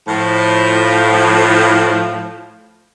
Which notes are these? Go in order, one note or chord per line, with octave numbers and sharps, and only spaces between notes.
A2 F3